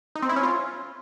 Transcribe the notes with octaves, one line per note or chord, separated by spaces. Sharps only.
D#4
C4
E4
C#4
F4